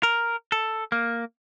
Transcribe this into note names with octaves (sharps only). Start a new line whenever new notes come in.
A#4
A4
A#3